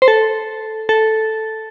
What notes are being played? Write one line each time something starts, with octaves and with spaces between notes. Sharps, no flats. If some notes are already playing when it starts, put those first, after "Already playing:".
C5
A4
A4